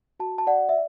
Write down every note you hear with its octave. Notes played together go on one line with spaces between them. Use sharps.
F#4 A5
A5
D5 F#5
E5